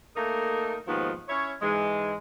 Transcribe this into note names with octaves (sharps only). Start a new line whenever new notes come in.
A3 A#3 D#4 A4 A#4
D#2 G#2 D#3 F3 B3
C#4 E4 C#5
G#2 E3 G#3